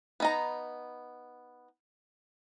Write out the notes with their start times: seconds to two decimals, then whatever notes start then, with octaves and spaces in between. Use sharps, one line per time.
0.20 B3 D#4 A#5